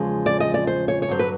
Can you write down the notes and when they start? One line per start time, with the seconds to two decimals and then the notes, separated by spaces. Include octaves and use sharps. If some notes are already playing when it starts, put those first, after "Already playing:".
Already playing: E2 C#3 F3 G#3
0.26 D5
0.40 D#5
0.54 D5
0.67 C5
0.88 C#5
1.02 C#5
1.08 G2 D3 F#3 C5
1.19 B4